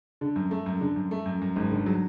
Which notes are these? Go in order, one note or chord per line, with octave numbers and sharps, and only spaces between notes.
D3
F#2
A3
F#2
D3
F#2
A3
F#2
F#2
G#1
D3
F#3